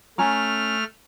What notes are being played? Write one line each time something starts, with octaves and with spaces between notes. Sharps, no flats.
A3 C#4 G#5 A#5 F6